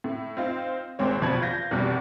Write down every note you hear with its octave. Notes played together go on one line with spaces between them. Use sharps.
A2
C4 D#4 F4
G#1 A#2 G#3 C4 C#5
A#1 B2 F3 B4 A5 G#6
F4 G6 A#6
F1 E2 B2 G3